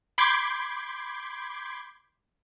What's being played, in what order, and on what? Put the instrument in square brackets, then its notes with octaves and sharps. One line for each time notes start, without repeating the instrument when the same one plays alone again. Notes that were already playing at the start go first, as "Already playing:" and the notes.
[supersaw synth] B5 C6 D6 G6 G#6